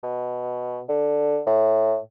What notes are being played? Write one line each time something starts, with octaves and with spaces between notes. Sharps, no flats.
B2
D3
A2